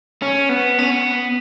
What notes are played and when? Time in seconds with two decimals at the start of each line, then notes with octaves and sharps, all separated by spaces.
0.22 C#4
0.49 B3
0.79 C#4
0.90 B3